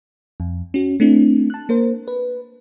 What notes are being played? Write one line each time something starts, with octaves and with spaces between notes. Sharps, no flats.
F2
C#4 F#4
A3 C4 D4 E4
A5 F#6
A#3 A#4 C5
B4